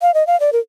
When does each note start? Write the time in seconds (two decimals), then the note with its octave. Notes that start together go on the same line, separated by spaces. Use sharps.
0.02 F5
0.14 D#5
0.27 F5
0.40 D5
0.53 A#4